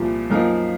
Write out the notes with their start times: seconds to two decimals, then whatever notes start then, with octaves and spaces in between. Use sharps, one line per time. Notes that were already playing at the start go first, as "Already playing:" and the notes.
Already playing: C2 A#2 F3
0.30 F#2 F3 A#3 D#4 A#4